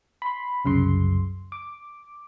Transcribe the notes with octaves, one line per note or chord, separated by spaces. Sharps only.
B5 C6
C2 F#2 C#3 C6
D6